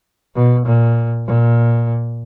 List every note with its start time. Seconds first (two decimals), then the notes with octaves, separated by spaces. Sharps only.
0.35 B2
0.66 A#2
1.26 A#2